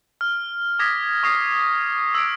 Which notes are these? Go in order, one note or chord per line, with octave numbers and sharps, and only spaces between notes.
F6
D6 D#6 G#6 A#6 B6
C#6 D#6 A#6 C7
E6 D7